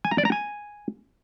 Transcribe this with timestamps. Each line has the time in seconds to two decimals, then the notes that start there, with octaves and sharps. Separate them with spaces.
0.05 G#5
0.11 A#5
0.18 D5
0.25 A#5
0.32 G#5